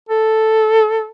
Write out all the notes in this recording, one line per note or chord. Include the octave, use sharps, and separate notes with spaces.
A4